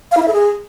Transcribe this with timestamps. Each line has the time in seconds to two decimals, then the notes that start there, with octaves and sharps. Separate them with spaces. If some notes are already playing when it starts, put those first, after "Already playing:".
0.11 F5
0.17 E4
0.22 E5
0.28 A4
0.33 G#4